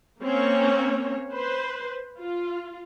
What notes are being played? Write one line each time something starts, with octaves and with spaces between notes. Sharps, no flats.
A#3 C4 C#4 C#5
B4 C5
F4